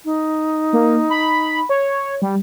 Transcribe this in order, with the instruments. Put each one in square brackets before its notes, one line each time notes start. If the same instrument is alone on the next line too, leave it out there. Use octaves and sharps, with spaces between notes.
[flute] D#4
[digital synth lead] A#3
B5
C#5
G3